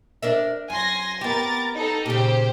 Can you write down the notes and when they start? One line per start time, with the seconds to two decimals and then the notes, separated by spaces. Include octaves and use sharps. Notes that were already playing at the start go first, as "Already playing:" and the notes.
0.22 D4 A#4 E5
0.70 F#2 G#5 C6 A#6
1.21 B3 G4 A#4 A6
1.74 D#4 A4
2.06 A#2 C#3 G4 C5